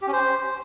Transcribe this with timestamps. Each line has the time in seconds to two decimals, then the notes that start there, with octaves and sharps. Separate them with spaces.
0.02 G4
0.07 C#4
0.13 C5